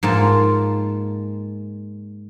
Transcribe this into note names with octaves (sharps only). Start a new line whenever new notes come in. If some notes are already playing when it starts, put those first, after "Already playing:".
G#2 A#3 F4 A5